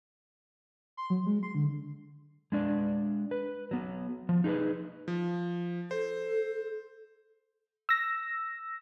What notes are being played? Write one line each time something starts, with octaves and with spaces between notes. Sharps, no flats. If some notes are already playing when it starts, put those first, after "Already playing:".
C6
F#3
G#3
C6
D3
G#3 D4 D5
B4
F#3 B3
F3
D#4 G#4 A#4 B4
F3
A4 C5
E6 A#6